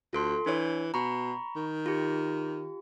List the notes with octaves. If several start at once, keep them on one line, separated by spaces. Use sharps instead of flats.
D2 F4 A4 C6
E3 D4 C#5
B2 A#5 B5 C#6
D#3
F4 G4